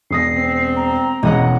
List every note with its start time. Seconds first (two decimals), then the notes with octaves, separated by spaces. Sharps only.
0.11 E1 D#6 A#6 C7
0.36 C4
0.76 A#5
1.23 E1 G#3 C#4 D#5 F#5